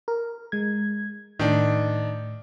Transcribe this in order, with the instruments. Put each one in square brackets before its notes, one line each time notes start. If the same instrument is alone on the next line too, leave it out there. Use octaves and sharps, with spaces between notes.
[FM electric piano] A#4
G#3 G#6
[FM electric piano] A2 [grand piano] D#3 D4